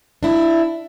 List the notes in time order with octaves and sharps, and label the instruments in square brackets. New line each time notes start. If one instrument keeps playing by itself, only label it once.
[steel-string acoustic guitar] D4 E4